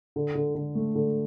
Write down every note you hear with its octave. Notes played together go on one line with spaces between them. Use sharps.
D3
D3
D3
A3
D3